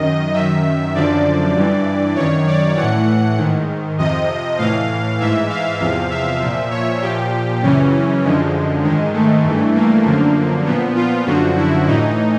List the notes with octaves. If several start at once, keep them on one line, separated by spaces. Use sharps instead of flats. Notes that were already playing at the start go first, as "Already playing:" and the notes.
Already playing: F#2 D#3 D#5
F#2 D#3 E5
F#2 D3 F3 D5
G2 E3
F#2 D#3 C#5
D5
A2 E3 F#5
G#2 D#3
F2 C3 F3 D#5
A2 E3 F5
G#2 E3 E5
F5
E2 C3 F3 F5
E5
A#2 F3
C#5
A#2 F3 G4
F#2 C#3 E3 C#4
F#2 D3 F3 G#3
G#2 D#3 G#3
A3
G2 E3
A#3
F#2 D3 F3
A#2 F3 B3
F4
F#2 D3 F3 F#4
E4
A2 E3 D#4